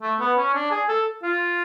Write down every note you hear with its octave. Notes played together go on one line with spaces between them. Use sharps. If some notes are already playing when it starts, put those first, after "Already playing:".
A3
B3
C#4
D4
G#4
A4
F4